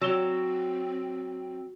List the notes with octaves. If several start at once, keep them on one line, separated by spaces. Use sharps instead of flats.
F#3 C4 E6 E7 G7